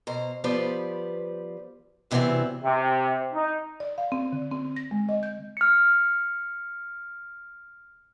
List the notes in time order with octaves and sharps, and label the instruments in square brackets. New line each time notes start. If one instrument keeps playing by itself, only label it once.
[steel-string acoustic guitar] B2 C5 A#5
F3 G3 B3 B4 C5 D5
G2 C3 E3 F#3 B3 C4
[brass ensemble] C3
D#4
[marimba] D5
F5
C4
D3
C4
A#6
G#3
D#5
G6
[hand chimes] F6 C#7